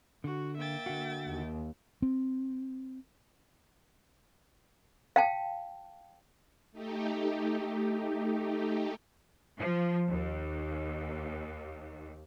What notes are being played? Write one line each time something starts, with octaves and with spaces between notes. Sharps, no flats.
D3 F#4
A#3 E5 G5 A6
D3 F#4
D#2
C4
F5 G5 A5
A3 D#4 G4
F3
D#2